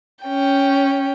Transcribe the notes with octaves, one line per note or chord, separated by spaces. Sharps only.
C#4 G5